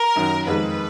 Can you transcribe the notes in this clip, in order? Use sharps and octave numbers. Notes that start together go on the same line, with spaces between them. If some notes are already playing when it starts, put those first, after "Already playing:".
Already playing: A#4
F#2 D#3 F#3
F2 D#3 G#3 B4